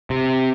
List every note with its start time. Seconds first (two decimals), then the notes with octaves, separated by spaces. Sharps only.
0.10 C3